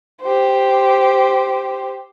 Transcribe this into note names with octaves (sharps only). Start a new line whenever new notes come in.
G4 C5